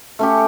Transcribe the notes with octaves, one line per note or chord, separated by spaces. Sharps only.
A3 C#4 G4